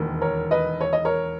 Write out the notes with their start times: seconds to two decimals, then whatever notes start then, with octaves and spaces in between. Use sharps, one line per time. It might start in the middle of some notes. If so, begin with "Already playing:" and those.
Already playing: E1 D#2 D#3
0.21 A#4 C#5
0.51 B4 D#5
0.81 C#5
0.93 D#5
1.05 A#4 C#5